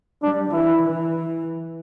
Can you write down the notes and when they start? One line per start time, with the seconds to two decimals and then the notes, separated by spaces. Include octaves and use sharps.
0.23 G3 D4
0.52 E3 E4
0.82 E3